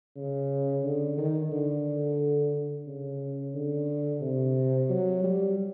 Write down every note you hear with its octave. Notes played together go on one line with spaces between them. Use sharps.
C#3
D3
D#3
D3
C#3
D3
C3
F#3
G3